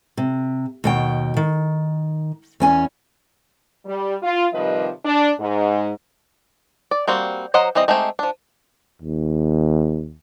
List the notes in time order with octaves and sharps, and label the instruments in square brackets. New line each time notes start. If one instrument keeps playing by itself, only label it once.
[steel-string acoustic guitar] C3
D#2 B2 G5
D#3
E2 C#4 G#5
[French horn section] G3
F4
C3 D#3 F3 G3 B4 D#5
D4
G#2
[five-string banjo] D5
G3 A#3 C4 F#4
F#3 C5 D#5 F#5 A#5
E3 G3 C4 D#5
G#3 A3 C4 D#4 G4
F3 D4
[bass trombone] D#2